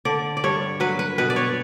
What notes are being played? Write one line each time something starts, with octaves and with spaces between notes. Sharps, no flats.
D3 D5
D5
G2 C#5
F#3 B4
B4
B2 B4
D5
C#5